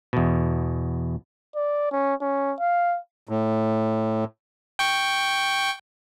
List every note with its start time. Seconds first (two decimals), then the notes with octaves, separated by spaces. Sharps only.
0.13 E2 B2
1.56 D5
1.92 C#4
2.21 C#4
2.60 F5
3.29 A2
4.79 G5 C#6